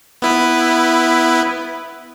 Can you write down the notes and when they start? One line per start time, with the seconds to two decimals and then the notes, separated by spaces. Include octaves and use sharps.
0.22 B3 E4 B4